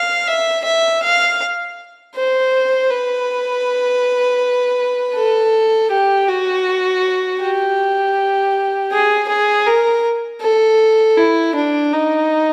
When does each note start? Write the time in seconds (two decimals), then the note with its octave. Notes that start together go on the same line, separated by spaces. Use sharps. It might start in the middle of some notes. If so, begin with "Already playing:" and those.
Already playing: F5
0.27 E5
0.65 E5
1.03 F5
2.15 C5
2.91 B4
5.15 A4
5.91 G4
6.28 F#4
7.41 G4
8.92 G#4
9.29 G#4
9.67 A#4
10.41 A4
11.17 E4
11.55 D4
11.92 D#4